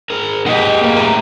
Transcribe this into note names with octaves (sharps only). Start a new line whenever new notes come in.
G#4 A#4
G#3 G4 D#5 F#5
A#3 A#4
A2 E5 A#5